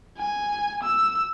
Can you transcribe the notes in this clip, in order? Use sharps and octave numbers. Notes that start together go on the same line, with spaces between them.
G#5
E6